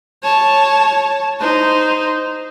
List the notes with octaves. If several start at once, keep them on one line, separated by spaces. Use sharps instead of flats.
C#5 A5
D#4 C5